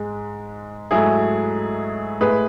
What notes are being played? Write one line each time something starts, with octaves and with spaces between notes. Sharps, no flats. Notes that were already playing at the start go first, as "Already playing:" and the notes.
Already playing: G#2 G#3
G#2 F#3 A3 E4 G#4
A2 G#3 G#4 B4